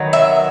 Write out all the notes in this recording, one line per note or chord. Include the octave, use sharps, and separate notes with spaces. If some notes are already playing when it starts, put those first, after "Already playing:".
Already playing: D#3 F#3 B3
E5